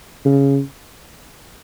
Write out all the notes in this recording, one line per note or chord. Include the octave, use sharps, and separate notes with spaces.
C#3